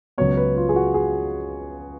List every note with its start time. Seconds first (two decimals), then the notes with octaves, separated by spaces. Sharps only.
0.18 C#2 C#3 F#3 B3 C#5
0.37 B4
0.57 F4
0.69 G#4
0.76 F#4
0.94 G#4